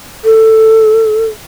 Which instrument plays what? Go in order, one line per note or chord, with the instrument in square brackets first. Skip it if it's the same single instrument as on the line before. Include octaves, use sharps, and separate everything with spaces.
[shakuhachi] A4